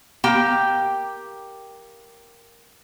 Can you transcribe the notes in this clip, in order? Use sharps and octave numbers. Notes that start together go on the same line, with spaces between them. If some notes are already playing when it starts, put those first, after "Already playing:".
A#3 G4 G5